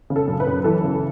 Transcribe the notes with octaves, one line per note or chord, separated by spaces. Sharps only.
C#3
A4
F#2
B4
F#2
E3 A4
C#3